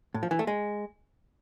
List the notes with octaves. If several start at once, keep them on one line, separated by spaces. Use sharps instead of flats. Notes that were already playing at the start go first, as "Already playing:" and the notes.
A2
F3
E3
A3
G#3